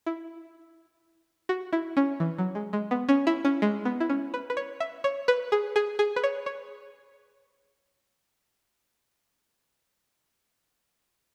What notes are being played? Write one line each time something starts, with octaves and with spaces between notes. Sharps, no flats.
E4
F#4
E4
C#4
E3
F#3
G#3
G#3
B3
C#4
E4
C#4
G#3
B3
E4
C#4
B4
B4
C#5
E5
C#5
B4
G#4
G#4
G#4
B4
C#5
C#5